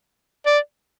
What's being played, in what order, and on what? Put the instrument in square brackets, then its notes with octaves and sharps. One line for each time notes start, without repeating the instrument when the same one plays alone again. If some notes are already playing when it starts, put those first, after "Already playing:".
[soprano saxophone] D5